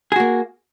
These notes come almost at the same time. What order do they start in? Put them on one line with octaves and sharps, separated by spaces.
G#4 F#4 A#3